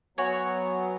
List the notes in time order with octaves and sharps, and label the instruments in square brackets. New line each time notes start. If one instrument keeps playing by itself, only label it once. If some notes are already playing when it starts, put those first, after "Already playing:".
[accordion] F#3 B3 [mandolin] F#4 C#5 G#5